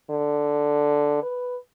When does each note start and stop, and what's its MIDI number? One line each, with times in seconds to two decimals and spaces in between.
0.10 1.21 50
1.23 1.57 71